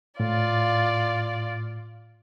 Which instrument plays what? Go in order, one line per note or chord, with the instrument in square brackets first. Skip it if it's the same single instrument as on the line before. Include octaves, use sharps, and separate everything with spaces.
[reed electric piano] A2 [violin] F4 D5